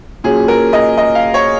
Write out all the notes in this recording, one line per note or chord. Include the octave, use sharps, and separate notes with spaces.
A#2 F#3 C#4 G#4
A#4
D#5
D#5
F5
C#5